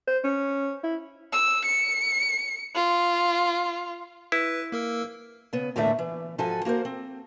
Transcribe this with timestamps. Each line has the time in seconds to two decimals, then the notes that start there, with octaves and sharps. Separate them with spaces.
0.08 C5
0.24 C#4
0.84 E4
1.33 E6
1.65 C#7
2.75 F4
4.32 E4 B4
4.72 A#3 A#4 E6
5.53 C#3 B3
5.76 D#2 A2 D3 E3 A3 E5
5.99 E3
6.38 G#2 F3 F#4 A4 G#5
6.65 A#3 F#4 A#4 C5
6.85 C4